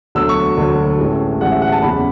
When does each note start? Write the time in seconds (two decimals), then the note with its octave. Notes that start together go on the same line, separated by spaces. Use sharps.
0.15 E1 D2 D3 F#3 E6
0.29 C#6
0.57 E1 D2 D3 F#3
0.99 A1 A2 E3 G#3
1.41 A1 A2 E3 G#3 F#5
1.51 E5
1.62 F#5
1.72 A5
1.82 F#1 E2 C#3 B5